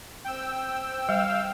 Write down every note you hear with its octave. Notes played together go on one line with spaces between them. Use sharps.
C4 G5 E6
G3 F5